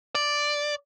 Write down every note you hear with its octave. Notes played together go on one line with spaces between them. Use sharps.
D5